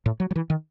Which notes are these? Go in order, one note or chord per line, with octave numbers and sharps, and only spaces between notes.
A2
F#3
F#3
E3
D#3